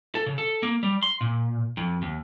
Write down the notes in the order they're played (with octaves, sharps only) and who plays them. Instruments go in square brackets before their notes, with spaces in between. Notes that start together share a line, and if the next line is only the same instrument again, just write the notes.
[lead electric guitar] A4
C#3
A4
A#3
G3
C6
A#2
F2
D#2